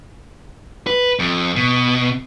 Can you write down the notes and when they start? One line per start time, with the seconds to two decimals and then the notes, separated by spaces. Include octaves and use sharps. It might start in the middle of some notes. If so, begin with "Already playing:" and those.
0.87 B4
1.19 F2
1.56 B2